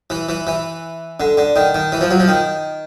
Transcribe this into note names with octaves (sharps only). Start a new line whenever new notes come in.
E3
E3
E3
D3
D3
D#3
D#3
E3
F3
F#3
F3
D#3